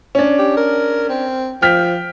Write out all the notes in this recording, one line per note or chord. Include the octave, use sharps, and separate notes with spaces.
C#4 D4
G4
A#4
C4
F3 G5 F6 B6